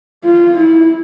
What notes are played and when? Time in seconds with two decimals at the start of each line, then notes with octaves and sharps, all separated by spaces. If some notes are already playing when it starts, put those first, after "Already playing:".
0.24 F4
0.59 E4